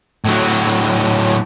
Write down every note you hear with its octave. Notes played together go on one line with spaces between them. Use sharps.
A2 F#3